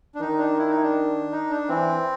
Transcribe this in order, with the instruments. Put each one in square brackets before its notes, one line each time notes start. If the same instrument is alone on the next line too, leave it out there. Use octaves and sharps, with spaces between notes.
[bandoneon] D4
[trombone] D#3 [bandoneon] D#4
[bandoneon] D4
E4
D#4
D4
D#4
D4
[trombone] E3 [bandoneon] C4